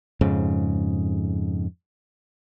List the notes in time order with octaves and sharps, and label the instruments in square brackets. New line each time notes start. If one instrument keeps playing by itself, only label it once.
[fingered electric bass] F2 G#2 C#3